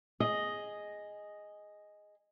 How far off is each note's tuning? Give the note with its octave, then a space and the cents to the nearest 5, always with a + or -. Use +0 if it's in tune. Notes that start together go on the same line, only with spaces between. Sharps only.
G#4 +0 D#5 +0